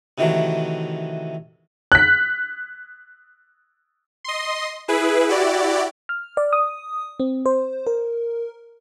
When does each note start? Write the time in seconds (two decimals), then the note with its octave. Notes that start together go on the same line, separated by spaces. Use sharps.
0.18 C3 D#3 E3 F#3 A3
1.92 F#6 B6
4.24 D#5 C6
4.88 E4 G#4 B4
5.27 E4 F#4 G4 D5
6.09 F6
6.37 D5
6.53 D#6
7.20 C4
7.46 C5
7.87 A#4